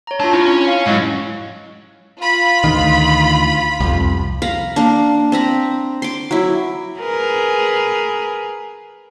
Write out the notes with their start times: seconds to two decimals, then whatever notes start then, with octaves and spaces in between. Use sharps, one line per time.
0.07 C#5 A#5
0.20 D4 F4 E5 A5
0.33 C#4 E4 C#5
0.67 F5
0.86 G#2 F#3 E4 D#5 C#6
2.19 F4 B5
2.64 D2 D#3
3.80 C2 F2
4.42 F5 A#5 B5
4.76 A#3 D4
5.32 C4 A#5 B5
6.02 C6 D6
6.31 F#3 E4
6.99 G#4 A#4 B4